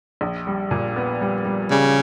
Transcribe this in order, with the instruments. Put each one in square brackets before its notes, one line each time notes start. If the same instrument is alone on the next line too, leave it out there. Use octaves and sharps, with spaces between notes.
[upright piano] A#1
G3
A#2
B3
G3
G3
[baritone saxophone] C#3 [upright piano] G3